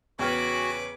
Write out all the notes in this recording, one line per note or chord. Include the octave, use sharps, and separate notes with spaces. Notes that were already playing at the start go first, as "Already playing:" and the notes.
E2 C#3 F#4 B4 G5 D6 F6